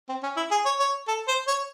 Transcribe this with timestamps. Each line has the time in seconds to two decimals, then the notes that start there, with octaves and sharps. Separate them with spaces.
0.09 C4
0.23 C#4
0.36 E4
0.51 G#4
0.65 C#5
0.80 C#5
1.08 A4
1.28 C5
1.47 C#5